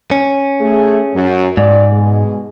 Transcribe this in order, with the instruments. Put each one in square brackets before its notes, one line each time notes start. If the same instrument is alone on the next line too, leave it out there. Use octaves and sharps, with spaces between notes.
[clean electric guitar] C#4
[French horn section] A3 G#4
F#2
[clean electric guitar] G#2 [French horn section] D5
[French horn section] B2 G#3